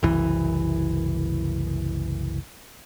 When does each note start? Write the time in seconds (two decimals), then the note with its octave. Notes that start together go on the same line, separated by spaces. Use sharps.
0.03 F#1 C2 E3